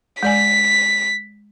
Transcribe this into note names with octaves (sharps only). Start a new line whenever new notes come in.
G#3 D5 G#5 B6